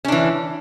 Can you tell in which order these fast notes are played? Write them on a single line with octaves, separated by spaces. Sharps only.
C#4 D4 E3